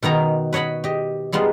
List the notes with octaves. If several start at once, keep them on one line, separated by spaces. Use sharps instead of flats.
B2 D#3 B3 A#5
B4 C#5 D#5 F#5 B5
G4 D#5
G3 G#3 B3 D#4 F4